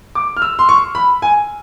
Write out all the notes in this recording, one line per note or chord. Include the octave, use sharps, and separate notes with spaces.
D6
F6
E6
C6
C#6
B5
G#5